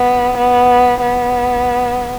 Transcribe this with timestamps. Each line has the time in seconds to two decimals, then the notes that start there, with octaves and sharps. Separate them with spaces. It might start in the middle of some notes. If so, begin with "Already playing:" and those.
Already playing: B3
0.37 B3
1.02 B3